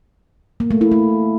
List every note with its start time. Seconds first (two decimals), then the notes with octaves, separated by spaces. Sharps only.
0.60 A#3
0.71 A3
0.81 E4
0.92 A3